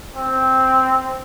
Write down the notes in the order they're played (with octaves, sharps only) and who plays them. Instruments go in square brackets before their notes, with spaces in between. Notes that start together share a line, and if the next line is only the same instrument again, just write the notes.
[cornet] C4